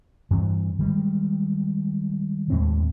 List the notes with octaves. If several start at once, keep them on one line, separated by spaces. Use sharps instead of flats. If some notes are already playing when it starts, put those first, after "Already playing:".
G2 E3 C4
D#3 G3 G#3
D#2 A2 G#3 C4